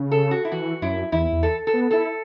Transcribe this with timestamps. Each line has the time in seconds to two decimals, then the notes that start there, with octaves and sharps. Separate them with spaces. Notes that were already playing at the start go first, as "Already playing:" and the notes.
Already playing: C#3
0.11 A4
0.31 F#4
0.45 E4
0.52 E3 F#4
0.82 F#2 E4
1.12 E2 E4
1.32 E2
1.43 A4
1.67 A4
1.73 B3
1.91 E4 A4